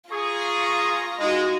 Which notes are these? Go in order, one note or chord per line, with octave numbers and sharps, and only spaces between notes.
F4 G#4 A#5 C#6
G#3 D#4 F#4